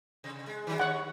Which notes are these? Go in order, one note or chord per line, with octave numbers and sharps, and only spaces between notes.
C3
G#3
D#3 F#3
D#2 C#5 F#5